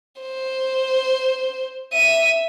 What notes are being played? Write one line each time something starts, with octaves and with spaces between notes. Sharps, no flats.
C5
E5 D#7